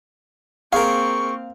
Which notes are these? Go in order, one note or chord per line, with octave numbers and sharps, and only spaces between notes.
A#3 C4 G#4 A#4 F5 C#6